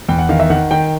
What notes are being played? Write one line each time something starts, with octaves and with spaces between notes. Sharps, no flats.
E2 G5
F#5
D#3 F5
E5
D#3 F#5
D#3 G5